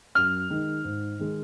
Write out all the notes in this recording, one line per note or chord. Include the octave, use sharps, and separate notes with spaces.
F#2 F6
D#3 G#3 D#4
G#2
D#3 G#3